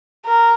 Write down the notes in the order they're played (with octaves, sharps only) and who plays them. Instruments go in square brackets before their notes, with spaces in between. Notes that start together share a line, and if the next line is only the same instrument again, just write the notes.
[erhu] A#4